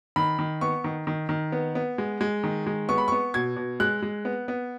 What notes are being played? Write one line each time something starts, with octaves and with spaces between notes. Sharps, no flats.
D#3 B5
D#3
B3 C#6
D#3
D#3
D#3
B3
B3
G#3
G#3
D#3
G#3
B3 C#6
B5
B3 C#6
B2 G#6
B2
G#3 F#6
G#3
B3
B3